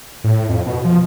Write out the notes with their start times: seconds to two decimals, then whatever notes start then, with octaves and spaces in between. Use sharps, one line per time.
0.24 A2
0.49 F2
0.66 B2
0.85 F3